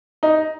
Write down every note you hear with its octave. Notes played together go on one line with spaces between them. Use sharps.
D#4